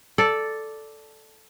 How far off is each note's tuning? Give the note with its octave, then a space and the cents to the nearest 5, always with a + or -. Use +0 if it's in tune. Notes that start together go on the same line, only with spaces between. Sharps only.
A4 +0 D5 +0